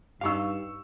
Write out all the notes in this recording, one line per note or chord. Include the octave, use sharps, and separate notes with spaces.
G2 D#4 G4 F5 C#6 E6